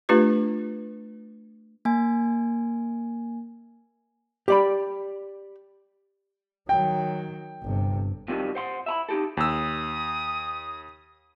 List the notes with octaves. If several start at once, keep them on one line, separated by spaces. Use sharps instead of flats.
A3 D4 F4 G4 B4
A#3 G#5
G4 D5 B5
D#3 F#3 G5
G1 C3
F2 C3 D#3 E3 F#3 G3
C5 F#5 C6
E5 A#5 B5
D#4 G4 A4
D#2 D#6 E6